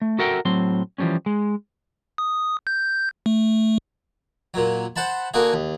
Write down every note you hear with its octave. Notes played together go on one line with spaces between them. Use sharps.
A3
F#4 A4 A#4 E5 F#5 G5
A2 F#3 C4 C6
E3 F3 G3 A3 C#4
G#3
D#6
G6
A3
A#2 F#3
C5 F#5 A5 B5
D3 A#3 F#4 G#4
D#2